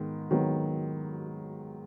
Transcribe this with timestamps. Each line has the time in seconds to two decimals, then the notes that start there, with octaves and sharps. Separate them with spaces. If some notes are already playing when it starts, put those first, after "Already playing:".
Already playing: G#2 D#3 B3
0.30 G#2 D#3 F#3 B3